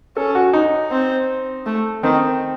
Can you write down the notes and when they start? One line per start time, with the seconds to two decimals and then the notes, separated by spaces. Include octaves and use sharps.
0.16 C#4 A4
0.35 F#4
0.53 D#4
0.91 C4
1.66 A3
2.03 D#3 C4